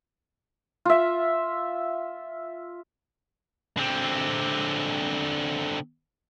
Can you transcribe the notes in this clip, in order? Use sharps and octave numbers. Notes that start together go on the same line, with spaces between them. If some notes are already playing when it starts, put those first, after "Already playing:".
F4 E5
D3 C4